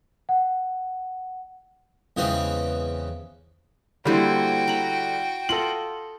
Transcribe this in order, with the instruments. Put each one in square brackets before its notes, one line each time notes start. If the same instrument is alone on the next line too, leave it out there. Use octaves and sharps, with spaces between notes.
[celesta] F#5
[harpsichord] E2 C#3 G#3 B3 C4
[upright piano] D3 G3 [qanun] A#3 E4 C5 [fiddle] F#4 G5
[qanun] A#5 B5
[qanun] F4 D#5 [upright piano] A4 F#7